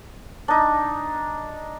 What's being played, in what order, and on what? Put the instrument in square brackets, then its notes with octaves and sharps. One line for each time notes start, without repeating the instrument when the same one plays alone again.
[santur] D4 D#4